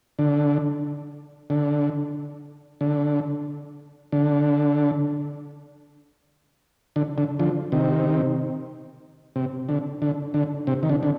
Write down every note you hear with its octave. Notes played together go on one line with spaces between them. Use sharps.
D3
D3
D3
D3
D3
D3
D3 F3
C3 D#3
C3
D3
D3
D3
C3
D#3
D3
D3